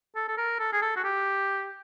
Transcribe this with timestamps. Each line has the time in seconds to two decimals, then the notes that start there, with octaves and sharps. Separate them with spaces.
0.16 A4
0.28 A4
0.38 A#4
0.59 A4
0.73 G#4
0.82 A4
0.96 F#4
1.04 G4